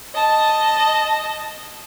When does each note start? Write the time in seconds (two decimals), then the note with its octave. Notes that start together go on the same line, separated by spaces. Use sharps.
0.15 D#5 A5